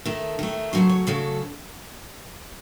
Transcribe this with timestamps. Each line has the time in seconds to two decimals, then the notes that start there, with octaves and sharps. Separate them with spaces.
0.05 D#3 A3 A4
0.39 D#3 A3
0.73 C#3 F#3 A3 C5
0.90 C#5
1.07 C#3 F#3 A3 A4